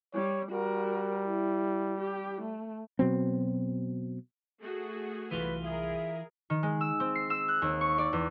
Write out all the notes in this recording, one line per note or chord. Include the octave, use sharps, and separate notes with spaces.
G3 C#5
G3 F#4 A#4
E4
G4
A3
B2 F#3 C4
A3 F#4 G#4
F#1 C2 E3 F4 B4
G#4 A#4 E5
D#3
G#3
E6
C4
C7
E6
F#6
D#2
C#6
D5
E2